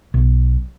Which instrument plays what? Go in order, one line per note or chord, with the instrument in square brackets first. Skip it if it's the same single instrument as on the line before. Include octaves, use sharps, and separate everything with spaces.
[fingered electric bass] B1